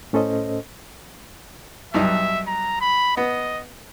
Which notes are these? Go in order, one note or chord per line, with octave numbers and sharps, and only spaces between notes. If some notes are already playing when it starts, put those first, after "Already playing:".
A2 C#4 A4 C5 D#5
B1 G2 D#4 E5
A#5
B5
B3 D#5